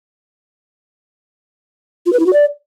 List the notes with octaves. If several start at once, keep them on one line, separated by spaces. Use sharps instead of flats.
F4
B4
E4
F#4
D5